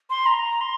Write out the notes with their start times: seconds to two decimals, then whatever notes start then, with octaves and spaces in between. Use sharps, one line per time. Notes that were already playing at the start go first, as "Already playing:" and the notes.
0.10 C6
0.26 A#5
0.61 C6